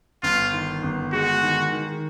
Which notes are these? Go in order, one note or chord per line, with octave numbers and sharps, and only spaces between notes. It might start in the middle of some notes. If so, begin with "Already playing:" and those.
G1 F4
D#3
G1
G#3 F#4
D#3
D#3